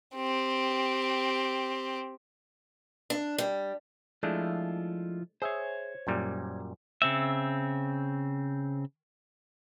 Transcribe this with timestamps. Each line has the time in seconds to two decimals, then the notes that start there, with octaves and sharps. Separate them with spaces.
0.16 C4 G4
3.10 D4
3.38 G3
4.23 F3 G#3 A3 D4 E4 F4
5.42 G#4 C5 C#5 E5
6.07 F#2 A#2 G3
7.02 C#3 C4 E5